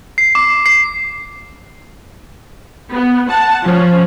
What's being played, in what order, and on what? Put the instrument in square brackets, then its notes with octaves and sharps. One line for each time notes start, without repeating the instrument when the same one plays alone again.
[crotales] C7
D6
C7
[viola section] B3
F#5 A5
[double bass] F3 [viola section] C#4